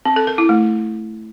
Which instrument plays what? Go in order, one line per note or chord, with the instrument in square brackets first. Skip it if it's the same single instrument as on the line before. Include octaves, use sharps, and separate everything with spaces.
[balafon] C4
A4
A#4
E4
A3